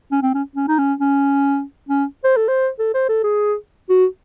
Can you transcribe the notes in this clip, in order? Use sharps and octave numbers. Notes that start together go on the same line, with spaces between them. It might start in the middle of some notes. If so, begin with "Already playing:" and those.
C#4
C4
C#4
C#4
D#4
C#4
C#4
C#4
C5
A4
C5
A4
C5
A4
G#4
F#4